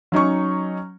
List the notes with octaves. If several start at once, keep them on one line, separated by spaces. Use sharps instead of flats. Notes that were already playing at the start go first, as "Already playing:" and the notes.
F#3 C#4 D#4 C#6